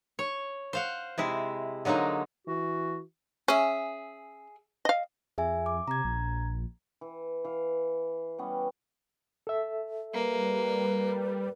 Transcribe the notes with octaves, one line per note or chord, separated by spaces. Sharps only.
C#5
C5 F5 F#5
C3 G#3 E4
D3 F#3 G#3 A#3 D#4
E3 F#4
C#4 G#4 E5
D#5 F5
F2 G#4 E5 G#5
D6
C3 A#5 G#6
A#1
E3
E3 F5
G3 B3 C#4
A4 E5
G3 A#3 B4